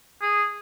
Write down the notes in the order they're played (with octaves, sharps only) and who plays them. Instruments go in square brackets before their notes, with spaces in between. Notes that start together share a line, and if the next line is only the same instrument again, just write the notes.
[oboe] G#4